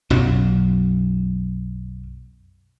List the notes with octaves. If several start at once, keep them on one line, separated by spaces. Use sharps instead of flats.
B1 F#2 F#3